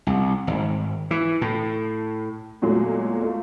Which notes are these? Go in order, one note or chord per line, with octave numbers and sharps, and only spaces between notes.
C2
G#1
E3
A2
E2 A#2 F#3 G#3 A3
A3 F4